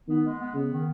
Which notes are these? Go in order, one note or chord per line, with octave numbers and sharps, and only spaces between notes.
D#3 B3
G#3
B3
C#3 B3
D#3